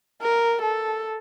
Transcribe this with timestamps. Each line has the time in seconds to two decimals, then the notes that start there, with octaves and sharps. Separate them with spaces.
0.21 A#4
0.62 A4